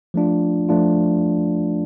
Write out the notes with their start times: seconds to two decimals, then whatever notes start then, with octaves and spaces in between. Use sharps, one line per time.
0.14 F3 A3 D4 F4
0.69 F3 A3 D4 F4